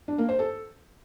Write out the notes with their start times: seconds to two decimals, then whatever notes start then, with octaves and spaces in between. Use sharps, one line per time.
0.08 D4
0.18 A#3
0.29 C5
0.39 A4